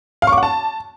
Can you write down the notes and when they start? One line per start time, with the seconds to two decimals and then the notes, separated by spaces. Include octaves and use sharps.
0.22 F5
0.27 C#6
0.32 D6
0.38 F#5
0.43 A5